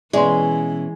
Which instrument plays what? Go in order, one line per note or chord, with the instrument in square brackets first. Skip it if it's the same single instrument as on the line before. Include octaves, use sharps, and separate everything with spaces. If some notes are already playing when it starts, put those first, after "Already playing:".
[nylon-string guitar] B2 C#4 E5 [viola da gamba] E3 [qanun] G#3 [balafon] D5 C6